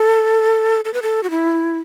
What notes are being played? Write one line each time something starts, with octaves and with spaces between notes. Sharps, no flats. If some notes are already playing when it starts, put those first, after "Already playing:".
Already playing: A4
A4
B4
A4
F#4
E4